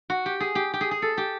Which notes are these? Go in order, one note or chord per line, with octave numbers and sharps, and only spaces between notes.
F#4
G4
G#4
G4
G4
G#4
G#4
A4
G4